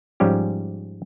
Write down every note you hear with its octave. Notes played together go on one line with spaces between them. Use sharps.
G#2 F3 G3 C#4 G4